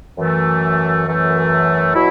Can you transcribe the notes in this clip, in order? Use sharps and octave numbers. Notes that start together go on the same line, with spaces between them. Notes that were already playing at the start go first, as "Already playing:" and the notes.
F#2 E3 A3
F#2 E3 A3
B2 F#3 E4